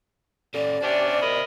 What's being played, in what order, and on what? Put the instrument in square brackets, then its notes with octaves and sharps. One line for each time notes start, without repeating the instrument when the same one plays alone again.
[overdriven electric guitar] C#4 A4 [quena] D5
[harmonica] C#4 D4 G4 [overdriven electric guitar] C5 E5
[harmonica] A#4 D#5 B5